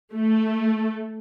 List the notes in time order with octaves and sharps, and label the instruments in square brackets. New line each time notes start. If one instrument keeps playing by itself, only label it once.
[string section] A3